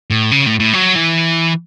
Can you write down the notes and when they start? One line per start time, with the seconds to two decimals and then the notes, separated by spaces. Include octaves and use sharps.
0.10 A2
0.31 C#3
0.46 A2
0.60 A2
0.74 F#3
0.95 E3